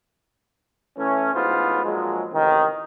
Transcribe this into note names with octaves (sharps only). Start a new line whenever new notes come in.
E3 A3 C#4
A1 G#2 B3 F4 C5
A#1 F3 F#3 G#3
A1 C3 D#3